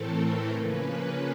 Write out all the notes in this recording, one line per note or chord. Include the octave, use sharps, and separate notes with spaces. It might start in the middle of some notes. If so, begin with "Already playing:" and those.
Already playing: A2 E3 A3 C4 A4 A#4
C#3 F3 A#3 C#4 B4